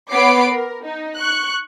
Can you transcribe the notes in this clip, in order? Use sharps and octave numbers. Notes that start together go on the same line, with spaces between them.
B3 C#5 B5 D6 C7 D7
A#4
D#4
C#6 F#6